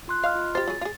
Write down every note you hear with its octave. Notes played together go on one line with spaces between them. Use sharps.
F4 C6 F#6
D#5 F5 C6 F6
F4
G4 C5 A6
F#3 G#4
F4 G#4